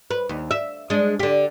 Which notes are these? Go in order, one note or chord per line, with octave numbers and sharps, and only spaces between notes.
B4
D#2
E5
G#3 D4
D3 G4